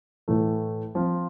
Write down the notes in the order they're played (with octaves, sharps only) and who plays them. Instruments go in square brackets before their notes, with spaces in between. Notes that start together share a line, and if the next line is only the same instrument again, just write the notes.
[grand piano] A2 E3 A3
F3 C4 F4